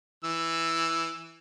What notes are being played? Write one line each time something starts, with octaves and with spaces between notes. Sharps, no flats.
E3 E6